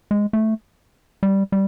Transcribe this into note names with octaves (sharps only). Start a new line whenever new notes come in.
G#3
A3
G3
G3